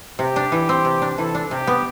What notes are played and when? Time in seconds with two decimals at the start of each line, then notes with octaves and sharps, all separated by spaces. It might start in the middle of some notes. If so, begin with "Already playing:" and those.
0.19 C3 G4
0.36 D4
0.52 E3
0.69 C4
0.85 C3
1.02 D4
1.18 E3 A4
1.35 D4
1.51 C3 G4
1.67 B3